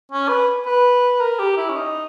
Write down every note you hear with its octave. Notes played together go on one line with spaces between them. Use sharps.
C#4
B4
B4
A#4
G4
E4
C#4
D#4